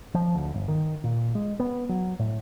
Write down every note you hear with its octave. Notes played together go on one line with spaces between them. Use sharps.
F3
D2
G1
D#3
A#2
G#3
B3
F#3
A2